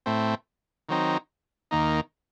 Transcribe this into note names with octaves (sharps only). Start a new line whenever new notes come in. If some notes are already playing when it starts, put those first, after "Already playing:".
A2 A3 C4
D#3 F#3 C4 D#4
D#2 D#3 A#3 D#4